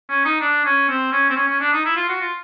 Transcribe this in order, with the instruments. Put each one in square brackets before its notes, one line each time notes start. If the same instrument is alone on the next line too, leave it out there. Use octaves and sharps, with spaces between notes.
[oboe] C#4
D#4
D4
C#4
C4
C#4
C4
C#4
C#4
D4
D#4
E4
F4
F#4
F4